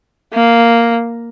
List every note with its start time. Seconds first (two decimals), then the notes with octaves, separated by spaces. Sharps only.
0.33 A#3